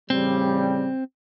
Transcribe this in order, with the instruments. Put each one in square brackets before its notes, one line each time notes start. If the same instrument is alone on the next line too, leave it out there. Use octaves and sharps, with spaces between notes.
[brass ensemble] A1 C#3 G3 [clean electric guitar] C4